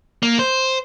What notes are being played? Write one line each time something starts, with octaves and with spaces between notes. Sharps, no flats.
A#3
C5